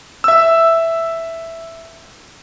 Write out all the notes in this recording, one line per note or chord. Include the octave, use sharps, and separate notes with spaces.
E5 E6